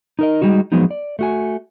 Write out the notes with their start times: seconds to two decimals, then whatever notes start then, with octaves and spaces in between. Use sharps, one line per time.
0.19 D#4 A#4 D#5
0.41 G3 G#3 D#4 F#4
0.72 F3 F#3 G#3 B3 D#4
0.91 D5
1.19 A3 F#4 G#5